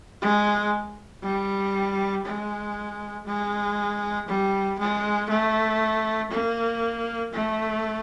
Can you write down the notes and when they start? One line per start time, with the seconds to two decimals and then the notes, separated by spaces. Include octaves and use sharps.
0.22 G#3
1.23 G3
2.25 G#3
3.27 G#3
4.28 G3
4.79 G#3
5.30 A3
6.31 A#3
7.33 A3